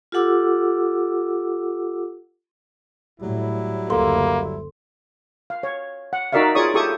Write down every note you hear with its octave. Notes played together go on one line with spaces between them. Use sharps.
F4 G4 A4 F#5 D6 E6
A2 F#3 G3 E4
F#1 D2 A#3 A4 C6
F5
C#5
F#5
D#4 F#4 A#4 D5 E5 F5
F4 G#4 C#5 D5 C#6 D#6
E4 G4 A4 C#6 D#6